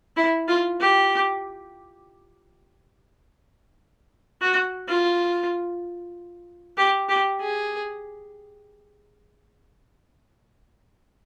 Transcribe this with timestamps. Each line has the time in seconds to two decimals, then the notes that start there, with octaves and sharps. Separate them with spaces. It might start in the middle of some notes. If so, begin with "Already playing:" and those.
0.16 E4
0.48 F4
0.80 G4
4.41 F#4
4.88 F4
6.77 G4
7.09 G4
7.40 G#4